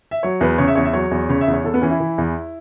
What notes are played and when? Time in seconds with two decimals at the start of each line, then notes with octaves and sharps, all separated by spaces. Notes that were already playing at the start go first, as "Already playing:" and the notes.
0.11 E5
0.23 F#3 C#5
0.41 E2 B4
0.58 C#3 C#5
0.68 E5
0.75 E2 C#5
0.85 E5
0.93 F#3 C#5
1.11 E2
1.29 C#3 C#5
1.41 E5
1.48 E2
1.53 C#5
1.64 E2 A4
1.74 B3
1.82 E3 C#4
1.91 E4
2.00 E3
2.18 E2